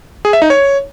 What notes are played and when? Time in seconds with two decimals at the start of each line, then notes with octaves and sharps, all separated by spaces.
0.25 G#4
0.33 E5
0.42 D#4
0.50 C#5